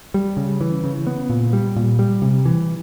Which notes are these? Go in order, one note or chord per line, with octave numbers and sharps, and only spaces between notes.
G3
C#3
E3
C#3
B3
A#2
G3
A#2
G3
C3
E3